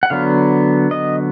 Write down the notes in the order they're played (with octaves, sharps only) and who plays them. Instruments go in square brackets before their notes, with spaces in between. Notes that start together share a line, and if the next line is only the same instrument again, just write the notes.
[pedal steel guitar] F#5
D3 F#3 B3 F5
D#5